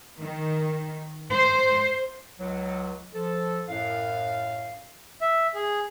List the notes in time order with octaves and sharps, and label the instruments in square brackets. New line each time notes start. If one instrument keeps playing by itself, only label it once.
[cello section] D#3
C5
[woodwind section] C#2 F#3
F3 A4
F#2 A2 F5
[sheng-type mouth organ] E5
G#4